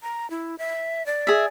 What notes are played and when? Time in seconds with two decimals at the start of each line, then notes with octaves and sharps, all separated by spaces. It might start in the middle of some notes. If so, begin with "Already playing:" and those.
0.03 A#5
0.30 E4
0.59 E5
1.06 D5
1.27 G#4 E5